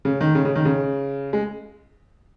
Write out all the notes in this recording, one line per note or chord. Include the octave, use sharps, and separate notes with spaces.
C#3
D#3
C#3
C#3
D#3
C#3
G#3